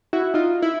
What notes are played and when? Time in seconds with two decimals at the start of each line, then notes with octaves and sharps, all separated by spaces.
0.13 E4 F#4
0.34 D#4 F4
0.62 E4